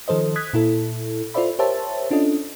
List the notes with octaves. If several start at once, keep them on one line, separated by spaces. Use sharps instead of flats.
D#3 F3 A4 C5 D#5
D#6 F#6 G#6 B6
A#2 E4 A4
F4 A4 C5 D5 E5 B5
G4 A#4 C5 C#5 E5 A5
C#4 D4 F4 A4 D#5